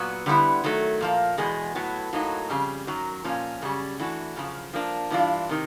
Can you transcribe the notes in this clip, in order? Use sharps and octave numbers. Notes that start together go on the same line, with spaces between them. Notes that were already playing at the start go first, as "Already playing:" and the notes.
Already playing: A#2 F#3 B3
D3 G3 B3 E4
D#3 F#3 A3
A#2 F3 A#3
E2 B2 G#3 B3
A2 F#3 B3
A2 F#3 A#3 D#4
F2 C#3 G3
F#2 D#3 F#3
A#2 F3 A#3 C#4
F#2 C#3 G3
E3 A3 D4 F#4
F#2 C#3 F3
F3 A#3 D4
G2 E3 A3 D4 F4
C3 D#3